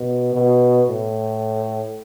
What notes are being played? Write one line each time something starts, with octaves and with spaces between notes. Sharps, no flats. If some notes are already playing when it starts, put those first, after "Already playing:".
Already playing: B2
B2
A2